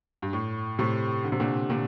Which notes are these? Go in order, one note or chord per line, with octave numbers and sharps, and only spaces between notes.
G2
A2
A2 C3
D3
C3
A#2 D3
A#2 D3